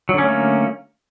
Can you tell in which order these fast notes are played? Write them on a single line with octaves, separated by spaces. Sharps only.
F#3 D3 C#4 A3 A#3